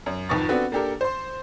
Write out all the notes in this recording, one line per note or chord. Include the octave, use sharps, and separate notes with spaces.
F#2
G#1 F2 D#3 B4 C#6 A6
B3 C4 D4 F#4 A4 B4
A#3 D4 G4 A4 A#4
C5 C6